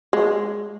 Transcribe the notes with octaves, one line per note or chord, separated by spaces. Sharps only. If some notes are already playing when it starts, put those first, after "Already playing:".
G#3